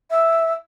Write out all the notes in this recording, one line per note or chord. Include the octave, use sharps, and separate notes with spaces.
E5